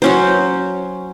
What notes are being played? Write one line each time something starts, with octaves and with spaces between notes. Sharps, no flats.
F#3 C#4 C5